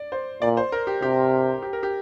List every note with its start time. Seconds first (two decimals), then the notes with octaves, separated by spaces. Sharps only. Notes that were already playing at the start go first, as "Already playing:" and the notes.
Already playing: D5
0.12 C5
0.42 A#2 D5
0.57 C5
0.72 A#4
0.87 G4
1.02 C3 G4
1.62 G4
1.73 A#4
1.83 G4